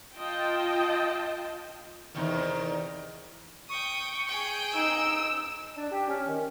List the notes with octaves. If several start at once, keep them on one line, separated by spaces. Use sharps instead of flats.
F4 D#5 G5 A5
E2 C3 D#3
G5 C#6 D#6
G#4 G5
D#4 E6 D7
D4
G4
C#4
D#3